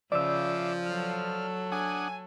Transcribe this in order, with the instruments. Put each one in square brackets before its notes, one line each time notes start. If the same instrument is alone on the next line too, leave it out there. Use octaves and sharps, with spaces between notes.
[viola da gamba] C#3 [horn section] F3 [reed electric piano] D5 E6 [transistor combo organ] E5 D6
[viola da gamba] F#3 A4 [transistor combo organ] F6
[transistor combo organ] D4 F#5 D#6 [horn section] G#5